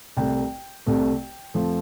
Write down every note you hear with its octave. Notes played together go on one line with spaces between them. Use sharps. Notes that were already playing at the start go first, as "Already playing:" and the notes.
C2 C3 A3 G5
C2 C3 A3
F2 F3 A3